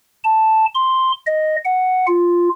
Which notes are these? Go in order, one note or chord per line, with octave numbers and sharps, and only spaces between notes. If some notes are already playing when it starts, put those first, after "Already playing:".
A5
C6
D#5
F#5
F4